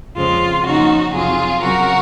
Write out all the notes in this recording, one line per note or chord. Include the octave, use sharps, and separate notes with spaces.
F2 C#3 G#3 C4 F4
C#3 F3 A#3 C#4 D#4 F#4
F2 C3 F#3 F4 G#4
C#3 F#3 C4 F#4 A#4